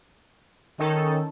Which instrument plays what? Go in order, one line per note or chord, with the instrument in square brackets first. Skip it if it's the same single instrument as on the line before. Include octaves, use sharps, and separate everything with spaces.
[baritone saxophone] D#3 [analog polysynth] C#4 D#4 A4